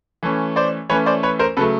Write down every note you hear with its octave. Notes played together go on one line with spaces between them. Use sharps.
E3 A3 C#4
C5 D5
E3 A3 C#4 B4 C#5
C5 D5
B4 C#5
A#4 C5
C#3 F#3 A3 A4 B4